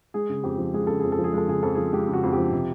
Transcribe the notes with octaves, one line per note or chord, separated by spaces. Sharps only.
G#3 G#4
C#3
F2 G4
F3
G#3 G#4
C#3 A4
F2 G#4
A4
F3
G#4
G#3 A4
C#3 G#4
F2 A4
F3 G#4
G#3 G4
C#3
F#4
F2
G4
F3
C3